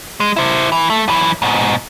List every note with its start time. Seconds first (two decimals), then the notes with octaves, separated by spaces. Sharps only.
0.20 G#3
0.36 E4 C5
0.72 E3
0.90 A3
1.08 F#2 E3
1.42 G#2 B2